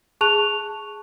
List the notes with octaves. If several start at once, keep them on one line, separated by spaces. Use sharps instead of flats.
G#4 A5 C#6 F#6 F7